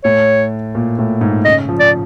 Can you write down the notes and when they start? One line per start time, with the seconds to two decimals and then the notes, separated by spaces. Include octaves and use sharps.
0.04 A2 C#5
0.75 A#2
0.99 A2
1.21 G#2
1.45 C#3 D#5
1.69 F3
1.80 D5